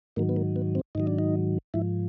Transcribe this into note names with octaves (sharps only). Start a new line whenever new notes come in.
G#2 D#3 F#3 A#3
B3
A#3
B3
C4
G#2 D#3 F#3 D#4
D4
D#4
G#2 F3 E4